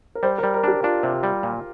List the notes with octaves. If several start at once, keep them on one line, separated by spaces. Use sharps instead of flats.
A#4
G3 C5
A#4
G3
A#4
D4 G4
D4 F4
C3
G3
A#2